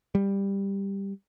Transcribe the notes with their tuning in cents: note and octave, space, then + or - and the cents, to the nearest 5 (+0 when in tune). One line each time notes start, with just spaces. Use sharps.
G3 +10